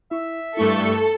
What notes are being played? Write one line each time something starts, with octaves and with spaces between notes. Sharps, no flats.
E4 E5 C#6
G2 A3 E4 A4 C6 C#6